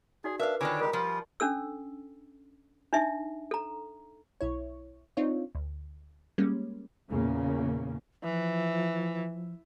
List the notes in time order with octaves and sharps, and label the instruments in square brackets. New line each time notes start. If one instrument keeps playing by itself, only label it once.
[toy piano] D#4 F#4 D5 [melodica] G#4
[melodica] D4 [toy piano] A#4 B4 [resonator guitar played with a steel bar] E5 F5
[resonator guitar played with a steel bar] D3 D#3 D4 [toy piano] F4 G#5 B5 [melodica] C#5 D6
[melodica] G3 G#3 G4 [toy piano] A#4 A#5
[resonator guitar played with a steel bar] F3 [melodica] G3 F4
[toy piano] C#4 D4 A4 E6
D4 D#4 E5
A4 A#5
[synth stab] B1 E4 C#5
C4 D4 D#4 F4 C#5
D2
G3 G#3 A#3 C#4
[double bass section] E2 A#2 C#3 A#3
[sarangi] E3 [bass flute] F3